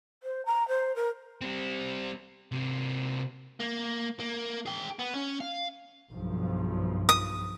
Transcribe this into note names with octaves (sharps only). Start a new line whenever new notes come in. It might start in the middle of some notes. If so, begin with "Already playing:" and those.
C5
A#5
C5
A#4
G3 C4
C3 A#3
A#3
A#3
G#4 G5
B3
C#4
F5
B1 G2 F3
D#6